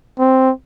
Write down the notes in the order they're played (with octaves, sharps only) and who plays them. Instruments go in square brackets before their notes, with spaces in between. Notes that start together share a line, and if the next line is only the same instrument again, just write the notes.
[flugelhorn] C4